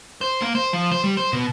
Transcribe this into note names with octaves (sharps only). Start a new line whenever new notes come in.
C5
A#3
C5
F3
C5
G3
C5
B2